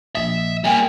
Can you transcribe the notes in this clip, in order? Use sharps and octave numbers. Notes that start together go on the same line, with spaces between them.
A#1 D#5 E5
G3 A#3 G5 G#5 A#5